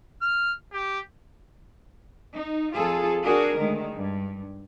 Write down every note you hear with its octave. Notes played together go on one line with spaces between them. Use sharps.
F6
G4
D#4
F2 F4 G#4 A4
D4 F#4 G#4 A#4
D2 D#3 G#3
G2